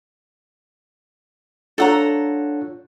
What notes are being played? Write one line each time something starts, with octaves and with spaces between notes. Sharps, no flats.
D4 F4 A4 C#5 F#5 A#5